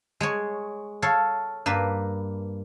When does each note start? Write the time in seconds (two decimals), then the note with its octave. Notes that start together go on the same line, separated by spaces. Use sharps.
0.21 G#3 G#4 C#5
1.02 A4 C#5 F5
1.66 G2 A#3 B4